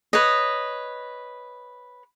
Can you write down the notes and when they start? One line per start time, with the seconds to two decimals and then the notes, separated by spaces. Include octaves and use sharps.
0.13 B4 C#5 D#5